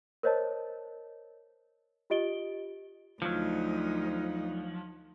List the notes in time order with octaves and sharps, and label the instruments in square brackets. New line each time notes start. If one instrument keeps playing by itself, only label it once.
[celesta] A#4 C5 C#5 D#5 A5
F4 G4 D#5 D7 G7
[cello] D2 D#4 [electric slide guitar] F3 F#3